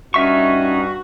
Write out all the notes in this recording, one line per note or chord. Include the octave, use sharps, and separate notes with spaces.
G2 C#4 D#4 F#4 E5 C#6